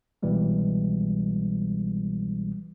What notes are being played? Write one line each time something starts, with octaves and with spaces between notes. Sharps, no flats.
C2 B2 E3 G3 G#3